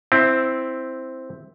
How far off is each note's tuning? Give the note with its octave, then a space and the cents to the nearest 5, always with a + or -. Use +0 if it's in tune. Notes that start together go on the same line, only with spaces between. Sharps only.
C4 +0 E4 +0